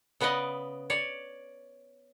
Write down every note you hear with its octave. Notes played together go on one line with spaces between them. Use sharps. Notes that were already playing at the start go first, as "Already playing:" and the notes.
C#3 B3 B4 D5 D#5
C#5 D5